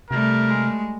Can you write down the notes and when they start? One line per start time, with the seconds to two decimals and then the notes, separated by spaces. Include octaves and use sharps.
0.11 C3 G3 A3 A#4
0.48 G#3